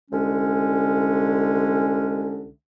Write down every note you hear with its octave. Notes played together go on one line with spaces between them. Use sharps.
C2 D3 G#3 C#4